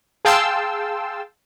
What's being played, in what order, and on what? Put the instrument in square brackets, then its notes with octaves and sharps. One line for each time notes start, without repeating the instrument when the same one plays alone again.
[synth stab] G#4 F5 G5 A5 C6 E6